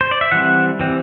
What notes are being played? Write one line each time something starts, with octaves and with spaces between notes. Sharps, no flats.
C5
D5
E5
E3 G3 C4 F#5
E3 G3 C4